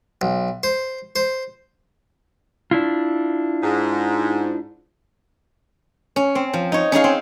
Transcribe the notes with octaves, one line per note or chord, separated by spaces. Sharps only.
B1
C5
C5
D4 E4 F4
G#2
C#4
C4
F3
D#4 C#5
C#4 D#4 G#4 F5
C4